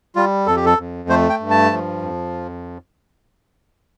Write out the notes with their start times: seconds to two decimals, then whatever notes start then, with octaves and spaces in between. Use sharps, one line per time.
0.16 G3 F4
0.46 F2 A4
0.56 G4
0.65 A4
0.78 F2
1.09 A3 C5
1.29 G5
1.40 G2
1.50 A5
1.71 F3
2.02 F2